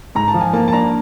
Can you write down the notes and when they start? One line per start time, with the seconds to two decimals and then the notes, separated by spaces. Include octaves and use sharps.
0.15 G#2 A#5
0.28 A5
0.34 F3
0.41 G#5
0.53 A#3 A5
0.68 A5
0.73 D4 A#5